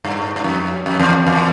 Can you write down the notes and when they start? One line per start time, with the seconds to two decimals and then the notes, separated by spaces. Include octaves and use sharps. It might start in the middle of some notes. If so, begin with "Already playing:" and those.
0.05 G2
0.36 G2
0.44 F2
0.86 F2
0.99 E2
1.27 E2